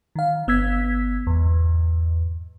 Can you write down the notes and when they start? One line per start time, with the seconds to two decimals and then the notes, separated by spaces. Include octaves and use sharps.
0.16 D#3 F5
0.47 G1 B3 E6 G#6 B6
1.27 E2 G#2